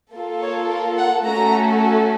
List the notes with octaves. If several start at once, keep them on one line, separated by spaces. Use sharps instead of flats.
A#3 F4 A4
C#5
A#4
F#5
A3 C#4 F#4 A4 A#5